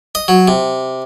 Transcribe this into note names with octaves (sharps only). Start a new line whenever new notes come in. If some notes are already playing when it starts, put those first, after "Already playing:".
D#5
F#3
C3